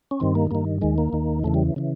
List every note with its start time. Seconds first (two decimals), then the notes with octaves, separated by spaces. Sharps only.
0.11 C#4
0.20 G2 D#3 C4
0.35 A#3
0.51 G2 D#3 A#3
0.82 D#2 D#3 G#3
0.98 A#3
1.13 D#2 D#3
1.44 E2 C#3 E3 A3
1.54 G3
1.76 C#3 E3